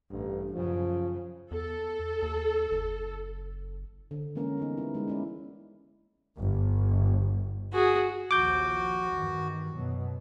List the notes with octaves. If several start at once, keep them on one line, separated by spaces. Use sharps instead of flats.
A1 G2
F#2 C#3 F3
E2 A4
D#2
F#1
D3
E3 G#3 A#3 C#4 A#4
G3 B3 D#4
D3 E4
G#3 D#4
C#4 E4 D5
G1
F#4 G#4
A#1 D#2 F3 F#4 D6 G6
E2 G2 D#3
F#2 B2 F#3